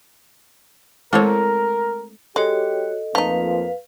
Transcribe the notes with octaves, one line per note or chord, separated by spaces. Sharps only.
G#3 A3 C4 E4 A#4 C5 C#5
G#3 F#4 G4 A4 C#5 D#5
F2 F3 A3 A#3 D#4 B4 F5